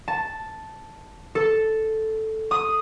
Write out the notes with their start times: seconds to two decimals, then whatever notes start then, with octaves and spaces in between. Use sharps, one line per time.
0.08 A5
1.35 A4
2.51 D#6